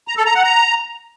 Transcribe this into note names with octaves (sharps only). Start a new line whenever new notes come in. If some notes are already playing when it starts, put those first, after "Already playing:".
A#5
A4
A#5
F#5
A#5